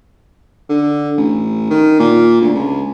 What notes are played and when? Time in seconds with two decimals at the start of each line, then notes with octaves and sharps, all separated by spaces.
0.69 D3
1.17 A1
1.70 D#3
1.99 A#2
2.41 D2
2.54 C#2